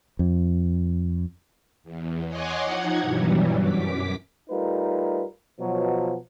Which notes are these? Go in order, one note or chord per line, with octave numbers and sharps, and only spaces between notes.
F2
E2
C#5 D#5 F#5 G#5 C6 D6
F3 D#4 F#5 G#6
G2 B2 E3 F#3 G3
F#2 D6 B6
G3 A3 D#4 F4 A#4 B4
B2 F3 F#3